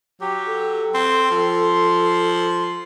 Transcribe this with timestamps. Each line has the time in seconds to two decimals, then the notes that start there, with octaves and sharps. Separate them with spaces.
0.21 F#3 G4
0.47 A4
0.94 C4 C6
1.31 F3